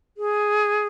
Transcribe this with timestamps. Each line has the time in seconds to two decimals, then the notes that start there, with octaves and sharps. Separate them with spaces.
0.17 G#4